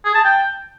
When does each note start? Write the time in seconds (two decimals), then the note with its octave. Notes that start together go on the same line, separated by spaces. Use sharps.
0.05 G#4
0.15 A5
0.24 G5